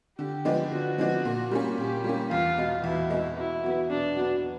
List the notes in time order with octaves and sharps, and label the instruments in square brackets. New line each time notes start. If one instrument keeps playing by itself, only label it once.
[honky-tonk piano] D3 [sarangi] G4
[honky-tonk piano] F3 G#3 B3 D4
[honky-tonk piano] D3 [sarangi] F#4
[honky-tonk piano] F3 G#3 B3 D4
A#2
G3 A#3 C#4
[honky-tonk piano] A#2 [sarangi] G4
[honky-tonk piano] G3 A#3 C#4
[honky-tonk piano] E2 [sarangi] F4
[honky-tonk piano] B2 G#3
[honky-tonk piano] E2 [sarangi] E4
[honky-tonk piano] B2 G#3
[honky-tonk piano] B2 [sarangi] E4
[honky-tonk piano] F#3 B3
[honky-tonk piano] B2 [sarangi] D4
[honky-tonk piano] F#3 B3